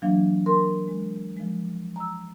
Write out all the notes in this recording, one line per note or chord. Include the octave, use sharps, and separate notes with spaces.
E3 F#3 A#3 D4 F5
A#4 C6
G#3
F3 G#3
A#5 E6